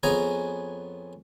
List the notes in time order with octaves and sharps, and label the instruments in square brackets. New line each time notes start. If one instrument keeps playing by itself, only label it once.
[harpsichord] F2 B3 C#4 G#4 G#5 A#5